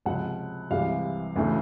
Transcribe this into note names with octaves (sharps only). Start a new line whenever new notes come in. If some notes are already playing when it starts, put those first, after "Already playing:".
C#2 C3 F3 F#5
C2 C3 E3 G#3 F5
D2 C#3 E3 A3